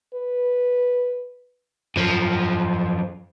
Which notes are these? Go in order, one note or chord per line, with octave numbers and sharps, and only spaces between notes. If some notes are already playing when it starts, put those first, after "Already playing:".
B4
F#2 F3